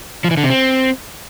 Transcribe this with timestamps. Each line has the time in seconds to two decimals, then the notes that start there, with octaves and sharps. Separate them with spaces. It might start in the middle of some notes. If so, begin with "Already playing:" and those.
0.24 F3
0.31 E3
0.37 D3
0.44 C3
0.50 C4